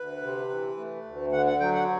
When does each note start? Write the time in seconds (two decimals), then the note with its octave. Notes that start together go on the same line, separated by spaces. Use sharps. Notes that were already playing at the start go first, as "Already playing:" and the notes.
Already playing: D2 B4
0.22 C3
0.49 E3
0.77 A3
1.05 D2
1.32 D3 F#5
1.46 F#5
1.60 F#3 G5
1.74 F#5